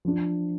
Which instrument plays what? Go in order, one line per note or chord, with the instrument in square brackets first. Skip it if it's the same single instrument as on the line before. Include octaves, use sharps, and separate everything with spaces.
[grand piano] F3 D4